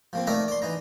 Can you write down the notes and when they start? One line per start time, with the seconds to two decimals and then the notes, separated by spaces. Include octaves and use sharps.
0.13 F3 A#3 C4
0.27 D#3 A3 A#4 D5 E5 A#5
0.48 D5 C6
0.62 E3 D#4 A#5